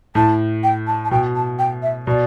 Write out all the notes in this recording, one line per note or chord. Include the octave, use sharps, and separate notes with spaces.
A2 A5
G5
A5
A5
B2 G5
A5
G5
E5
B2 D5